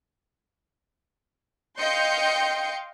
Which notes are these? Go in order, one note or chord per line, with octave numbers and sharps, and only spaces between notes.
D#5 F5 G5 C6 G6 C#7